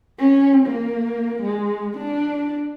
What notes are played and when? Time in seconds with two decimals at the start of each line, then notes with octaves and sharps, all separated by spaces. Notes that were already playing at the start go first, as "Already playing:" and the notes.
0.19 C#4
0.66 A#3
1.42 G#3
1.97 D4